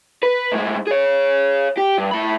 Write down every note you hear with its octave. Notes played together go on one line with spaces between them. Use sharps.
B4
A2 G#3
G#4 C#5
G4
G2
A2 B5